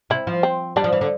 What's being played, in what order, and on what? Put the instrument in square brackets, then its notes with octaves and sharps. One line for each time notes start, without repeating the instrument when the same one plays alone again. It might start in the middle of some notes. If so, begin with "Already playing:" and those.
[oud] C3 [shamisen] E4
[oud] F3
[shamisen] C4
[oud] G3 [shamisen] D4
[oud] F3
E3
D3